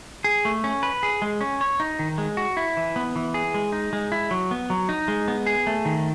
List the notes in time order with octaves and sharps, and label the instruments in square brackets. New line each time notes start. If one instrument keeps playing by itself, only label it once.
[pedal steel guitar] G#4
A3
C#4
B4
G#4
G#3
C#4
C#5
D#4
D#3
G#3
F#4
E4
E3
B3
E3
G#4
G#3
D#4
G#3
E4
F#3
B3
F#3
D#4
G#3
B3
G#4
A3
D#3